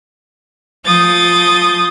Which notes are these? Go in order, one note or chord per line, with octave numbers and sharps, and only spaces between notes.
F3 D#6 G6 A6